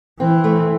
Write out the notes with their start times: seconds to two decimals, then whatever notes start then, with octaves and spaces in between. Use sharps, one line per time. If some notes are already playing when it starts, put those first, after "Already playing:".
0.19 E3 C4
0.44 A3